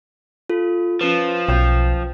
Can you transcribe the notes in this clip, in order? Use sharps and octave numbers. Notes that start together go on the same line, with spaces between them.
F4 A4
F3 C#4 B4
B1 G5 G6